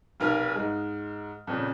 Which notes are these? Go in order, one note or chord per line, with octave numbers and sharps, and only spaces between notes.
F1 B1 A#4 F6
G#2 G#3
F2 A#2 C#3